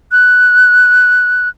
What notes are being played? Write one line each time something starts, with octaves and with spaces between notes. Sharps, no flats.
F#6